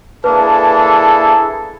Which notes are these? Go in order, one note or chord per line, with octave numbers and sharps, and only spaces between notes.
A#3 D4 E4 G#4 A4 B4